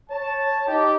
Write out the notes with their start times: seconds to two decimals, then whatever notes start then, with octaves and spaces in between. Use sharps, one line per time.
0.11 C#5 A5
0.67 D#4 G4